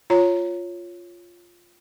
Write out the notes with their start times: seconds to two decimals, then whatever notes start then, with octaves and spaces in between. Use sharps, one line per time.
0.10 F4 C#5 A#5